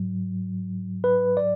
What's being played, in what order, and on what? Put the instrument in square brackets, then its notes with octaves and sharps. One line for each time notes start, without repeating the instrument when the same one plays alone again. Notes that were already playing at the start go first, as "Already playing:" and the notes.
Already playing: [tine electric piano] G#2 F#3
B4
D5